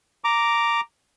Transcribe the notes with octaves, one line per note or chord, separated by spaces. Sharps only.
A#5 D6